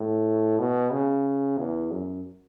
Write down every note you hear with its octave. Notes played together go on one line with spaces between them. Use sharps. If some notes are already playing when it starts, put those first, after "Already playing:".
Already playing: A2
B2
C#3
E2
F#2